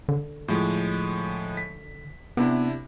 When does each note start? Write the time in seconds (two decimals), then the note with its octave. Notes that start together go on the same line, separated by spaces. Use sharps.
0.09 D3
0.48 A2 F3 G#3
1.57 B6
2.37 C3 B3 D4 E4